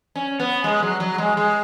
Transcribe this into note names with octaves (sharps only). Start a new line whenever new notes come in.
C#4
B3
G#3
F#3
F#3
G#3
G#3